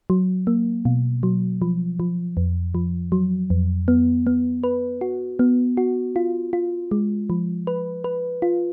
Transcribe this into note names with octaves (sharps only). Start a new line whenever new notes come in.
F#3
A#3
B2
F#3
F3
F3
F2
F3
F#3
F2
B3
B3
B4
F#4
B3
F#4
F4
F4
G#3
F3
B4
B4
F4